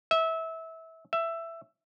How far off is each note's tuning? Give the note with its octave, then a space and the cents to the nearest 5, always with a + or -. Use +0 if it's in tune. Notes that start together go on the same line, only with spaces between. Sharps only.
E5 -25
E5 +10